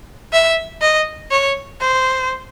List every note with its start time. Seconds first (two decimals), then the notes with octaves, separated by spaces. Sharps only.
0.33 E5
0.82 D#5
1.31 C#5
1.81 C5